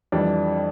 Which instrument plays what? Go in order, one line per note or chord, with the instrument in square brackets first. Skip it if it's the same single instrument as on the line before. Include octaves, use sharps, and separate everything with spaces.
[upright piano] F2 E3 G3 D4